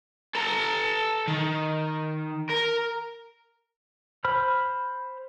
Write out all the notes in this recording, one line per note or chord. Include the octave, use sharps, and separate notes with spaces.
A4 A#5
D#3
A#4
C5 B5 F6